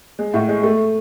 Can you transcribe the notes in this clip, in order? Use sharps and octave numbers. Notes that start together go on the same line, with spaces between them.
G#3
A2
G#3
A3